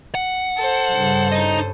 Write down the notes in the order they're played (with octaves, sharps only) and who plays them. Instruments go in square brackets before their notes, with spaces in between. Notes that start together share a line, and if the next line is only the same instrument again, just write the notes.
[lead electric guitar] F#5
[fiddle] A4 C5
[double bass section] G2 C#3
[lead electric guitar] D#4 D#5